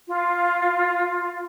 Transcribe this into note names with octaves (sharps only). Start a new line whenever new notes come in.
F4